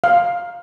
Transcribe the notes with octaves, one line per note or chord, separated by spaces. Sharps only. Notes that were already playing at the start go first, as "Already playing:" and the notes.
F5